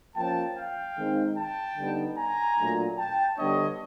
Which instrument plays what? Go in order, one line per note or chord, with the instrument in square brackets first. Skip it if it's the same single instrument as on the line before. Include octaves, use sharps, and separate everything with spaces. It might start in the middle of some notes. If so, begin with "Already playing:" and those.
[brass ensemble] F3 A#3 C#4 G5 A5
F5 G5
D#3 G#3 C4 D#4
G5 A5
D3 G3 B3 D#4
G#5 A#5
A#2 F#3 A3 D4
G5 A5
D3 G3 B3 D4 C#5 D#5